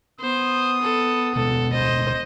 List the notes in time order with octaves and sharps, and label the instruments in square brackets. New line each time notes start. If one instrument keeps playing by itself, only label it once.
[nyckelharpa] B3 [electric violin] C5 [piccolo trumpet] D#6
[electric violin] A4
[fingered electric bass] D1 B2 G#3 [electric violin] A4
[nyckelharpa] C5 [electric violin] D#5